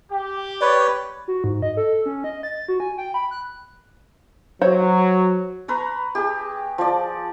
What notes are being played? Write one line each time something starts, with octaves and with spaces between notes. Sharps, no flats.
G4
B4 C#5 D5
F#4
G#2
D#5
A4
C#4
D#5
A6
F#4
G#5
G5
B5
F#6
F#3 C5 C#5 F#5
B4 A#5 C#6
G4 G#4
F3 D5